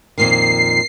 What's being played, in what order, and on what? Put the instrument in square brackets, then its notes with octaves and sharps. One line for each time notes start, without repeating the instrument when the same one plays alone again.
[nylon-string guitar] F2 A#2 D#3 [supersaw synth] C7